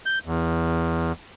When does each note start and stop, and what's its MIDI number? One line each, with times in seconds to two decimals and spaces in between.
0.06 0.19 91
0.26 1.12 40